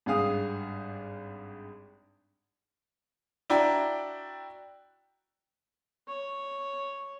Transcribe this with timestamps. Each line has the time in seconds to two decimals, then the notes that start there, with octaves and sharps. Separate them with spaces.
0.06 G#1 G2 G#4 F5 D#6
3.50 D4 E4 F#4 D5 G5 A#5
6.08 C#5